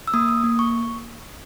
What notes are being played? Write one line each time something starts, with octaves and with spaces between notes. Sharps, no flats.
E6
A#3 D#6
D#6
A#3
C#6